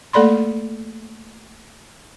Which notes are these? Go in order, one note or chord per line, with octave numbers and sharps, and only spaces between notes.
A3 A#3 A4 D5 B5 C6